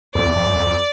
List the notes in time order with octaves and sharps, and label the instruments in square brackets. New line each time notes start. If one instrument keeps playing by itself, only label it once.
[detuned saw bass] F2 [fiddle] D5
[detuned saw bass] E2
F2
F#2
F2
F2